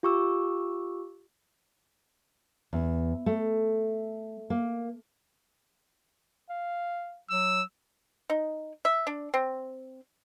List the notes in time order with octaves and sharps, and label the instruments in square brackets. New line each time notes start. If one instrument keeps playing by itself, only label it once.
[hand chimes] F4 G4 C#6 D6 E6
[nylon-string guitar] E2
A3
A#3
[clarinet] F5
[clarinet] F#3 [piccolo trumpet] E6
[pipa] D#4
E5
D4
C4